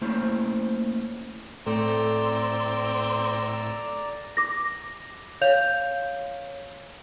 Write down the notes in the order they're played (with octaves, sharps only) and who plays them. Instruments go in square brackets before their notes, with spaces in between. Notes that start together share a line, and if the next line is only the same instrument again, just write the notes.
[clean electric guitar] A3 A#3 C#4 E4 C5
[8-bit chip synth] A2 E6 [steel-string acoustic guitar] A3 [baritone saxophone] C4 [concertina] D5 A#5
[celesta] D6 A#6
C#5 F5 G6 F7